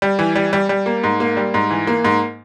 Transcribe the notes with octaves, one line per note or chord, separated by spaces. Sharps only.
G3
E3
G3
G3
G3
A#3
G#2
A#3
G3
G#2
E3
A#3
G#2